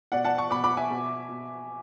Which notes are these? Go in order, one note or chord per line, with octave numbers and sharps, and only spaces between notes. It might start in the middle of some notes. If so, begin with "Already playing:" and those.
B2 D5 F#5
F#5 A5
A5 C#6
B2 B5 D6
B5 D6
E5 G#5
B2
B2